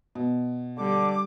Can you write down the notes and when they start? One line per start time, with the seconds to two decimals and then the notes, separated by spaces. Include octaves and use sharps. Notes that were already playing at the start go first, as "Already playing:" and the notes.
0.15 B2
0.78 D3 G3 D6